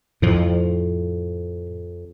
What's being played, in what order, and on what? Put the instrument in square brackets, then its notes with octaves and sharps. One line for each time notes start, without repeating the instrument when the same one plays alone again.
[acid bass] F2 [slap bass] A2 F3